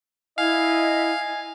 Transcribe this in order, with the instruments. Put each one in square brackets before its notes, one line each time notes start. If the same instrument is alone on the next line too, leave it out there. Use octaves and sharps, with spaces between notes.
[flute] E4 [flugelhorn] D#5 [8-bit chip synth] F5 [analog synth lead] G#5